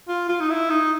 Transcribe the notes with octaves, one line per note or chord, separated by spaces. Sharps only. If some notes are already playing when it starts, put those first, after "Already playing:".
F4
F4
D#4
E4
D#4